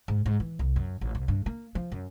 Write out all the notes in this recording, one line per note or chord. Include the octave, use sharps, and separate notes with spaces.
G#2
G#2
E3
C2
F#2
A1
C2
G2
A#3
F3
F#2